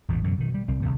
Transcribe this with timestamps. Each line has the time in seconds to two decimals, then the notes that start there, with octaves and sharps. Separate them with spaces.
0.08 A1 E2 G#2 B2
0.24 F#2 B2 D3
0.38 B2 D#3
0.54 G3
0.68 C2 C4
0.82 A#1 A2 C3 D#3